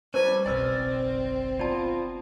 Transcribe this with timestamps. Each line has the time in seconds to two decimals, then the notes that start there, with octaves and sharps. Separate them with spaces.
0.14 G3 C#4 E4 B4 C5 G#5
0.46 F#1 B1 C4 D5 G#5 E6 F6
1.59 B3 F4 D5 A5